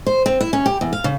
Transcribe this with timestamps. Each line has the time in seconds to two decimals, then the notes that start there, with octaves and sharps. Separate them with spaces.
0.06 C5
0.26 C4
0.41 E4
0.53 C#4
0.66 G4
0.81 E2
0.93 F5
1.04 C#3